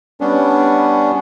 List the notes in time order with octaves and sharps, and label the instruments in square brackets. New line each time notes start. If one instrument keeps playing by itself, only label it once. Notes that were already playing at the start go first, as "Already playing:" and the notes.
[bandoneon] G3 B3 C#4 D4